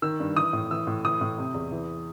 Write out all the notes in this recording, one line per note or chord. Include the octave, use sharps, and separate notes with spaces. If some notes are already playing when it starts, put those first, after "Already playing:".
D#3 E6
G2
E3 D#6
A2
E3 E6
A2
E3 D#6
A2
C3
E2
E3